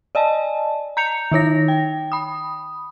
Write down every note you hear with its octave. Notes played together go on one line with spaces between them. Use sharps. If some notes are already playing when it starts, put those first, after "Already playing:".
D5 D#5 G#5 A5
A#5 G6 C#7 F7
D#3 D#4 C#5 A#6
G5
B5 D#6